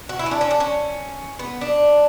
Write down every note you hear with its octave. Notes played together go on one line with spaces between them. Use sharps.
F#4
E4
C#4
D4
C#4
D4
C#4
B3
D4